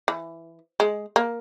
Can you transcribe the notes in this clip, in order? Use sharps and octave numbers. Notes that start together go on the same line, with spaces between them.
E3
G#3
A#3